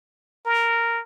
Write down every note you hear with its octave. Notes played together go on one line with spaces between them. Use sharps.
A#4